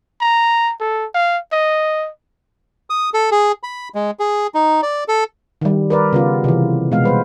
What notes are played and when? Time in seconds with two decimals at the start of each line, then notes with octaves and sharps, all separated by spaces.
0.21 A#5
0.81 A4
1.15 F5
1.52 D#5
2.90 D#6
3.14 A4
3.31 G#4
3.63 B5
3.95 G#3
4.19 G#4
4.54 D#4
4.83 D5
5.08 A4
5.61 D#3 G3
5.90 A#4 B4 D5
6.13 C#3 B3 F4
6.44 C3 E3
6.91 B2 G#3 B3 F5
7.04 G3 B4 C5